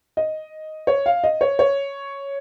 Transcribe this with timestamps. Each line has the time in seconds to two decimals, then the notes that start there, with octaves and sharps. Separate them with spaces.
0.17 D#5
0.87 C#5
1.06 F5
1.24 D#5
1.41 C#5
1.59 C#5